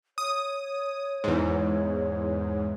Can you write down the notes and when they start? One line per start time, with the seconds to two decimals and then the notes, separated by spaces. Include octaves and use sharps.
0.18 C#5 D#6
1.24 E2 G#2